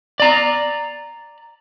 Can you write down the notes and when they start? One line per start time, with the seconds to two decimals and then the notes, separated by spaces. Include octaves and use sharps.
0.20 D5 A#5